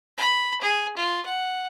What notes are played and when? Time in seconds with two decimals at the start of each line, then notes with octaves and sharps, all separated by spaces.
0.17 B5
0.62 G#4
0.97 F4
1.26 F#5